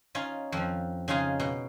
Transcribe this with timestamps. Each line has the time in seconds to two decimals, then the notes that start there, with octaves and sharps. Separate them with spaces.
0.15 C#4 D#4 F4
0.52 F2 F3
1.08 C#3 C#4 D#4 F4 G#4
1.40 B2